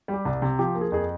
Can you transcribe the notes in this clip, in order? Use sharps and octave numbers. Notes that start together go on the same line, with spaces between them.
G3
G4
C2
C3
F3 G4
A#3
G#4
F2 G#4